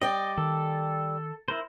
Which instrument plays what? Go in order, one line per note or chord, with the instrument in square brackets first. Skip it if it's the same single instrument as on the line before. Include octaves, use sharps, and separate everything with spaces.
[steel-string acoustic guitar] G3 D5 G5 [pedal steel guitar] D#5
[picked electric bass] D#3 [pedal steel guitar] A4
[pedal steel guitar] E4 A#4 C5